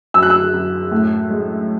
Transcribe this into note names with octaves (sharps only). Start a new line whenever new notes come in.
F#2 E6
F#6
E6
F#2
A2
G#3